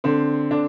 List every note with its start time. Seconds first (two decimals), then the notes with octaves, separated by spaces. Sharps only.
0.04 D3 C4
0.51 D3 D4